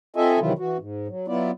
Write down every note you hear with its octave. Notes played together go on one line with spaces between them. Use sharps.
C4 F4 A4 D#5 E5 G#5
C3 D#3 E3 F#3 E4 F4
E3 F#4
G#2
F#3
F#3 B3 E4 F4 D5